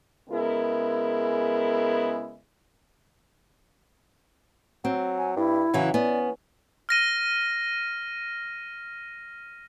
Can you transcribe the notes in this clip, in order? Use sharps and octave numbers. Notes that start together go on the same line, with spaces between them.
C#3 G#3 B3 E4 A#4
F#3 C4
G#5
G2 E4
C#3 E3 F#3
B3 C#4 D5
F6 A#6 D#7